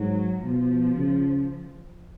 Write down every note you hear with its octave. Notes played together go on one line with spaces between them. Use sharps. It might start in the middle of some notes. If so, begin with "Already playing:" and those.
Already playing: G#2 F#3
B2 F3
C#3